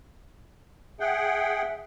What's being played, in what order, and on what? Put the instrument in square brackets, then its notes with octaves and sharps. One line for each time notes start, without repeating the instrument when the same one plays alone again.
[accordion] G#4 F#5 G5 [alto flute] E5